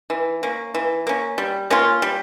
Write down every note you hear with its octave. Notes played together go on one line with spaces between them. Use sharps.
E3
A#3 C#4
E3
A#3 C#4
G3
A#3 C#4 F4
G3